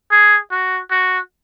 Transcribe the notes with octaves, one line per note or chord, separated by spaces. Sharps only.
G#4
F#4
F#4